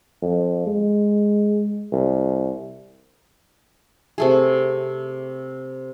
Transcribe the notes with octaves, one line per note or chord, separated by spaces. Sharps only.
F2
G#3
C2
C3 A3 G#4